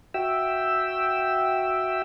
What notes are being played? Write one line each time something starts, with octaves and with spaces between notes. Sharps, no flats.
F#4 E5 G5 E6